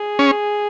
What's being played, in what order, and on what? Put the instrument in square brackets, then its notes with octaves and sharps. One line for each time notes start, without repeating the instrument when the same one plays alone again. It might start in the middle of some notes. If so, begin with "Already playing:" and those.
Already playing: [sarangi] G#4
[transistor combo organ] C#4